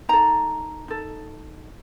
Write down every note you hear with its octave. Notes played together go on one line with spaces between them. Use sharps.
D#4 A4 A#5
D#4 A4